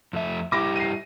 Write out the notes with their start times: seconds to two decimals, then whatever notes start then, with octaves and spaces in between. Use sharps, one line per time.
0.13 F2 A3 E5
0.52 G2 E4 G4 D6 A#6
0.76 C7 D#7